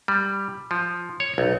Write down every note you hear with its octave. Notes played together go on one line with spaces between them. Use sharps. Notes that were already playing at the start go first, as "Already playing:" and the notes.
G3
F3
C#5
B1